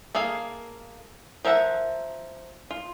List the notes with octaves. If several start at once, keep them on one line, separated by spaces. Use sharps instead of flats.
A#3 G#4 A4 F5
F3 A#4 E5 F#5 A#5
F4